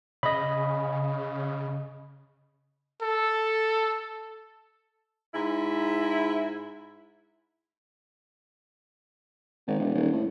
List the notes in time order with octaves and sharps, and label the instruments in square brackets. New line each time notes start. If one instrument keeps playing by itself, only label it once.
[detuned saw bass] C#3 [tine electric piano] D#5 B5
[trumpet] A4
[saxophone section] G#2 E4
[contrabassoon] G#1
E1
D#1
A2